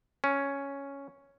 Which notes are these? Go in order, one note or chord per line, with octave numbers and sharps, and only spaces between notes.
C#4